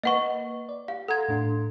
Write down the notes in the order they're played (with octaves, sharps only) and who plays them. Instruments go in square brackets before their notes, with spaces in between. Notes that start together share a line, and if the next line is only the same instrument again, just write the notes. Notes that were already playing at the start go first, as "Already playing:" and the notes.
[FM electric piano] A#3 B4 [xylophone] D#5 F#5 C#6
[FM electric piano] D5
[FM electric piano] G4 [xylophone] F5
[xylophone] A4 G#6 [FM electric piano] F#5 A#5 C6
[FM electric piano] A2 D4 C6